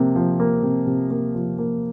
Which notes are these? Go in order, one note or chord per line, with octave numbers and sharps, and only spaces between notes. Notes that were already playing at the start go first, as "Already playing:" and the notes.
Already playing: C3 F3 A#3
F3
A#3
C3
C3
A#3
F3
A#3